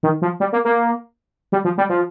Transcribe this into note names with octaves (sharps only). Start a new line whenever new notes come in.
D#3
F3
G3
A#3
A#3
G3
F3
G3
F3